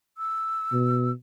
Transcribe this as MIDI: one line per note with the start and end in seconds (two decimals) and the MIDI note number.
0.18 1.11 88
0.72 1.11 47